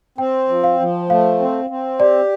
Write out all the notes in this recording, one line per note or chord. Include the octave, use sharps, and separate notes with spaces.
C4 G5
F3
F5
F3
A3 F5
C4
C4
G4 D5